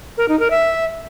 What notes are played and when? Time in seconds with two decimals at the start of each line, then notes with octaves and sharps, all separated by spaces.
0.18 A#4
0.29 D#4
0.40 A#4
0.51 E5